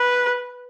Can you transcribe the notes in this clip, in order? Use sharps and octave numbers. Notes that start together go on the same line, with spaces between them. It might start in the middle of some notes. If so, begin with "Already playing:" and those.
Already playing: B4